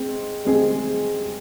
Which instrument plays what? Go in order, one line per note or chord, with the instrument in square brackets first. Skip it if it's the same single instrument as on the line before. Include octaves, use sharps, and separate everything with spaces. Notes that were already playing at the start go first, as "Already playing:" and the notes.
Already playing: [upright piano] G#3 C4
G#3 C4 G#4